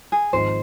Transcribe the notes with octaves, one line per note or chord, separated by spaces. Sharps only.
G#4
G#1 G#2 F3 C5